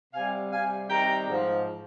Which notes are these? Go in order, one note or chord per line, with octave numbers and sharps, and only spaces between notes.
C3 G3 F5 G#5
C3 G3 F5 G#5
C3 D#3 G3 G5 A#5
G#2 F3